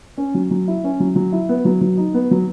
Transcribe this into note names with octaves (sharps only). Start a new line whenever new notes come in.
C#4
F#3
F#3
E4
C#4
F#3
F#3
E4
B3
F#3
F#3
D#4
B3
F#3